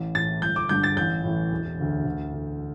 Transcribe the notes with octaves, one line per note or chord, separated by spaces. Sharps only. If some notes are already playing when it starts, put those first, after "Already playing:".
Already playing: A1
A2 E3 A6
G1 G6
D6
G2 D3 G6
A6
A1 G6
A2 E3
E1
D2 D3
D2
D3